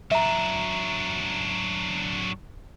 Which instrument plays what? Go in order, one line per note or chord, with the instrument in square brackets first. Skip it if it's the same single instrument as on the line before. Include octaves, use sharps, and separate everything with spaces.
[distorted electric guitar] F#3 D4 [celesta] E5 A#5